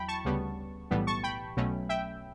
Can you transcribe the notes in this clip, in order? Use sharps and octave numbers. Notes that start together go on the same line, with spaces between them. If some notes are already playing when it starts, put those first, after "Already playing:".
Already playing: E2 F#3 E4 G5 B5
A5 C#6
D2 C#3 G3 B3
B1 A2 E3 G3 B3
A5 C#6
G5 B5
B1 B2 F#3 A3 C#4
E5 G5